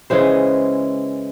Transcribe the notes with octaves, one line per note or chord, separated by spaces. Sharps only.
C#3 E3 G#3 C5